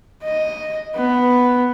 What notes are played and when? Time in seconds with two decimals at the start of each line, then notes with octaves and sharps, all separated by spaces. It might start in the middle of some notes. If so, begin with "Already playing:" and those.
0.24 D#5
0.96 B3